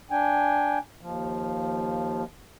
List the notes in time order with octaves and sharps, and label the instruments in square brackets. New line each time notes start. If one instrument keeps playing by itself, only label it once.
[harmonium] D4 G5 G#5
D#2 F3